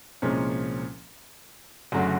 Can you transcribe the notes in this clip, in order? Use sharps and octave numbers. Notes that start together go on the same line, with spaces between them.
C2 A#2 F3 G#3 C#4
F#1 F#2 D3 F#3 A3